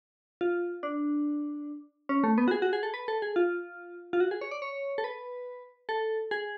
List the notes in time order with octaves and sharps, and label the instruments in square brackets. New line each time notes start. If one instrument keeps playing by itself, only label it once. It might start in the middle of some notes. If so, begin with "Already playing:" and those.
[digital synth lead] F4
D4
C#4
A3
B3
F#4
G#4
F#4
G#4
A4
B4
A4
G#4
F4
F4
F#4
G#4
C#5
D5
C#5
A4
B4
A4
G#4